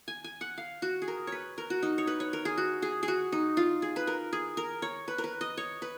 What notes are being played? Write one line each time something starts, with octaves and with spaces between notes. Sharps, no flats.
G#5
G#5
F#5
F5
F#4
G#4
A#4
B4 C#5
A#4
F#4
D#4
C#5
B4
C#5
A#4
G#4
F#4
G#4
G#4
F#4
D#4
F4
G#4
B4
A#4
G#4
A#4
C#5
B4
A#4
B4
D#5
C#5
B4